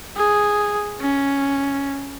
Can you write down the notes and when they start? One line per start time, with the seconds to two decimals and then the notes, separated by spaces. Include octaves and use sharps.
0.17 G#4
1.01 C#4